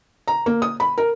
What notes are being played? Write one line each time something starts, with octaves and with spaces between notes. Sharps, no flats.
A#5
A#3
D#6
B5
A#4